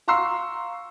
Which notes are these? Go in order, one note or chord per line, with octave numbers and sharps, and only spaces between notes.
F5 A#5 C6 C#6 E6 C7